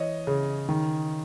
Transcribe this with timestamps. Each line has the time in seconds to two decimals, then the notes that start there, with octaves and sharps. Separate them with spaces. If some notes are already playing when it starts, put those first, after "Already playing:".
Already playing: E3 C#5 D#5
0.27 C#3
0.69 D#3